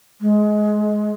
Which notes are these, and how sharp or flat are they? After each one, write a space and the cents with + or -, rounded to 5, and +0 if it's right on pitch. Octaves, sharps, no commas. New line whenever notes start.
G#3 +20